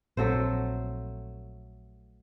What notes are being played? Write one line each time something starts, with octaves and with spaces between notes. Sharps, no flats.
A#1 F#3 A3 C4 C5